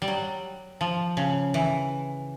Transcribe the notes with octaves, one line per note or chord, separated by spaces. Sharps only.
G3
F#3
F3
C#3
E3